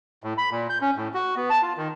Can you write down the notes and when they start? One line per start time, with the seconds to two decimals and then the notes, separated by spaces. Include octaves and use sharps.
0.24 A2
0.38 B5
0.51 A#2
0.69 G6
0.81 C#4
0.96 A2
1.14 F#4
1.36 B3
1.50 A5
1.62 F4
1.77 D#3